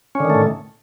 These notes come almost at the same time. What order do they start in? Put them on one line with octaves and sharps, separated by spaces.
C#4 D3 D#3 A3 A2